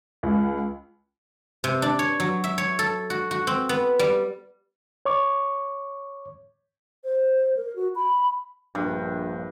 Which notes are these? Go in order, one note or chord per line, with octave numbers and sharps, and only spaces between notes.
C#2
C3
D4
C#5
F#3
E5
C#5
A4
F#4
F#4
C4
B3
G3
C#5 C#6 D6
C5
A#4
F#4
B5
A#1 G2